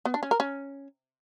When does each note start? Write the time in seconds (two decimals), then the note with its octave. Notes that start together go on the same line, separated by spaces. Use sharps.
0.05 B3
0.14 D4
0.23 C#4
0.31 A#4
0.40 C#4